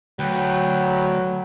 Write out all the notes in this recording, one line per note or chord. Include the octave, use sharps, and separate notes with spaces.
D2 F#3 B4 G5